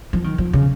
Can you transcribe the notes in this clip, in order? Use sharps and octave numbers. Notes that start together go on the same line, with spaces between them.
F3
D#3
F3
C#3